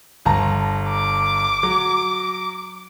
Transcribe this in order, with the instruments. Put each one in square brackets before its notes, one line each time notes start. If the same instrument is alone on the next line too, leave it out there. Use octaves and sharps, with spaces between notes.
[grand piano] G1 A5 A#5
[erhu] D6
[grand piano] F#3